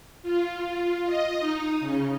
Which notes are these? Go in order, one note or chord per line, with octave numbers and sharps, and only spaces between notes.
F4
D#5
D#4
C#3